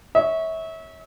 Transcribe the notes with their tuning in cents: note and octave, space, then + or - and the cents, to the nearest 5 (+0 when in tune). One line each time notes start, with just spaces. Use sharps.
C#5 +0 E5 -30